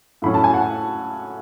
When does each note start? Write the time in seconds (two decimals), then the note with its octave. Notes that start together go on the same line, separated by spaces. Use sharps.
0.22 A2 F#3 C#4 B5
0.34 A5
0.44 G#5
0.54 F#5